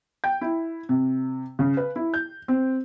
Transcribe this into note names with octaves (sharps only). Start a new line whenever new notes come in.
G5
E4
C3
C#3
B4
E4
G6
C4